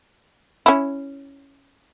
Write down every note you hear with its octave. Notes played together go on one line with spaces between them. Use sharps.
C#4 E4